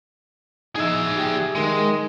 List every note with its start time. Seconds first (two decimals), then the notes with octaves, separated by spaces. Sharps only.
0.76 D#4 G#4 E5
1.16 G4
1.55 D#3 G#3